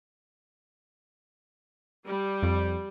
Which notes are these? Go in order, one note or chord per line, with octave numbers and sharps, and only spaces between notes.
G3
F2